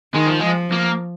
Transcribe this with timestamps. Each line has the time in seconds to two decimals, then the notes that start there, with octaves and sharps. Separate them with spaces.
0.13 D#3 G#3
0.26 F3
0.39 F3 G#3
0.72 A#3